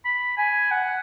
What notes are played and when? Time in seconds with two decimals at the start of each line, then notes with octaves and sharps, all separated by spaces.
0.05 B5
0.37 G#5
0.71 F#5